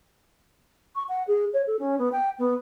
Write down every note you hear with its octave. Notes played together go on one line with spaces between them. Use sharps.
C#6
F#5
G#4
C#5
A4
C#4
B3
G5
B3